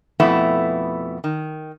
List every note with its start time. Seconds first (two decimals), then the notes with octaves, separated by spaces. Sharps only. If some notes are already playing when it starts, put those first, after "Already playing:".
0.20 F2 B2 A3 B3 E4
1.24 D#3